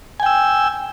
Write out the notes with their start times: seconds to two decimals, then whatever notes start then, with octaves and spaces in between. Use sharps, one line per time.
0.20 G#5
0.23 G5
0.26 E6